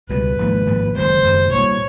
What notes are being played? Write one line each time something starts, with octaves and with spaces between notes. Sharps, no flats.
C#2 B2 G3 B4
G#1 G#2 F3 A#3
G#1 G#2 F3 A#3
F#1 F#2 D#3 G#3 C5
F#1 F#2 D#3 G#3
C2 A#2 G3 C#5